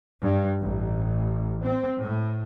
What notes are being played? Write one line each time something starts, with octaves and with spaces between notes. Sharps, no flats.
G2
A1
C4
A2